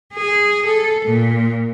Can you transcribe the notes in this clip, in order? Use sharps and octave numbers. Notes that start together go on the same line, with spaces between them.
G#4
A4
A#2